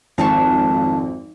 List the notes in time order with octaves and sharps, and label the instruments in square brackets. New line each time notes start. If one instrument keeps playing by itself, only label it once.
[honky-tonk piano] G#1 [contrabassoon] F2 [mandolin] F5 A5 C#6